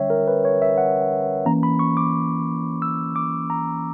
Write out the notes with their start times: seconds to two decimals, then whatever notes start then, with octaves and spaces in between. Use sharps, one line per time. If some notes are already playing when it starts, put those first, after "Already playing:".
Already playing: D3 G3 C#4 C#5 E5 G5
0.10 A#4
0.28 B4
0.45 C#5
0.62 E5
0.78 F#5
1.46 E3 A#3 C#4 A#5
1.63 B5
1.79 C#6
1.97 D6
2.82 E6
3.16 D6
3.50 A#5